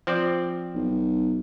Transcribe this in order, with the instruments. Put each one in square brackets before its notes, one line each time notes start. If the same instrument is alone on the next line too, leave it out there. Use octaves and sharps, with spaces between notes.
[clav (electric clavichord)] F3 C4 D5
[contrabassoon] B1